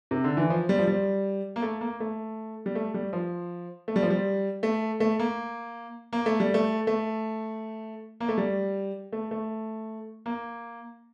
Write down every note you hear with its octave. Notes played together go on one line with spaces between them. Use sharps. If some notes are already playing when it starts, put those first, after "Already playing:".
C3
D3
E3
F3
G3
F3
G3
A#3
A3
A#3
A3
G3
A3
G3
F3
A3
G3
F3
G3
A3
A3
A#3
A#3
A3
G3
A3
A3
A#3
A3
G3
A3
A3
A#3